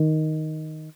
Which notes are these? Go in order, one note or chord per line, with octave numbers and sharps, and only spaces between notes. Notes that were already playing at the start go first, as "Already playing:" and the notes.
Already playing: D#3